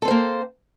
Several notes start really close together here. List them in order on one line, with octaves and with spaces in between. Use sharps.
A4 C4 C5 A#3